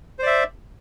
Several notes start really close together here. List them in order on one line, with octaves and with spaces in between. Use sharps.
C5 D5 E5